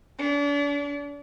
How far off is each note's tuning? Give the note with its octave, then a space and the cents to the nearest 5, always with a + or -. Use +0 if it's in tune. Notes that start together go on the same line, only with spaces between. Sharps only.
D4 -40